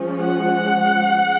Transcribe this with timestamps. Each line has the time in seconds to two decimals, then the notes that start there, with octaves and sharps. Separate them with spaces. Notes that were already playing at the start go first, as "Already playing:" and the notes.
Already playing: F3 G#3 C#4
0.22 F#5
1.09 G#3